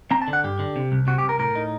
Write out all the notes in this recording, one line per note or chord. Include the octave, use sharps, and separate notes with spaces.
C4 A#5
A5
D3
F#5
G2 G4
D3
C3
C2
C3 F#4
G4
C2
A#4
A2 A#4
D#4